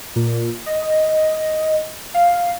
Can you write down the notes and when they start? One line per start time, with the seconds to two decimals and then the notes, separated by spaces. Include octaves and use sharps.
0.16 A#2
0.66 D#5
2.14 F5